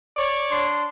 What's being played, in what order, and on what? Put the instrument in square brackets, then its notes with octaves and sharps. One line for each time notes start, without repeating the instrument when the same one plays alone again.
[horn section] C#5 D5
[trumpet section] D4 C6